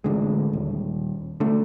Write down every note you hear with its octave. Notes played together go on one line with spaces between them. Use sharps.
A1 D3 G#3
D#1
D3 A3